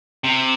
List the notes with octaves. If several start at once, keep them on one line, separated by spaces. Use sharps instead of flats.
C3